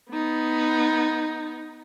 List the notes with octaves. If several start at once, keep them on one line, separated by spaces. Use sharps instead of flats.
B3 D#4